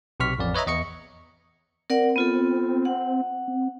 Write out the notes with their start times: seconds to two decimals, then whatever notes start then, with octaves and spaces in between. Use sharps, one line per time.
0.20 B1 C3 C#6 F6 B6
0.39 A1 F2 D5
0.54 B4 C#5 D#5 E5 A#5
0.67 E2 D#5 C#6 C#7
1.90 C4 A#4 D5 F#5
2.16 B3 F4 A4
2.85 F#5
3.48 C4